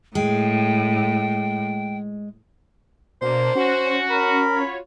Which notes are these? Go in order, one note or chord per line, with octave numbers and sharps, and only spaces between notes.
A2 G#3 G5
B2 A#3 D4 C5
C#4 F#4
A#4 B5
F4 F#4 C#5